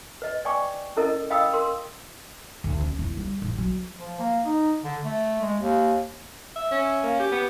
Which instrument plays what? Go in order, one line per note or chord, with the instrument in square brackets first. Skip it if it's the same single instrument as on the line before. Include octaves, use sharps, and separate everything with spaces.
[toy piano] B4 D#5
D5 G5 G#5 C#6 D6
C#4 E4 A4 A#4 D#5
D#5 F5 G5 B5 D#6 E6
A#4 C6
[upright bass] D2
C#4
E2
G3
A1
F#3
[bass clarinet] F3
A#3
D#4
D3
A3
G#3
D#2
[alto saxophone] E5
[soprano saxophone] C#4
[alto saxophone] A#3
G4
[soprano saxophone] B3